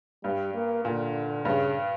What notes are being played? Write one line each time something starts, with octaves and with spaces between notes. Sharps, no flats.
G2 G3
A#3
A#2 D3
G2 C#3